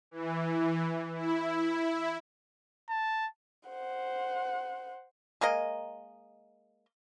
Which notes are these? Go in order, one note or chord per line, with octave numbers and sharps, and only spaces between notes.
E3
E4
A5
C5 F#5
G#3 A#3 A#4 D#5